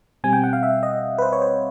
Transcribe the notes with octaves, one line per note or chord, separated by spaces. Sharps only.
B2 G3 C4 G#5
G5
F#5
F5
E5
D#5
B4
C5
C#5
C5